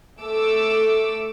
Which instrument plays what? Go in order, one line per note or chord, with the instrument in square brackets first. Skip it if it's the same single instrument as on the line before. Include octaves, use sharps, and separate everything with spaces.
[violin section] A3 D6 E6